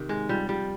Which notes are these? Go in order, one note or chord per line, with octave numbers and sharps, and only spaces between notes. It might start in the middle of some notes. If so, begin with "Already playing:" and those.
Already playing: C3 D#3
G#2 G#3
F3 G3
F3 G3